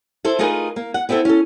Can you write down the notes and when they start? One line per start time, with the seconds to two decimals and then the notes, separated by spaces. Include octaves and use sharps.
0.25 E4 A4 C5
0.39 A3 D#4 F4 G#4 A#4 B4
0.76 A#3
0.94 F#5
1.09 B3 C4 E4 G#4 A4
1.25 C#4 A4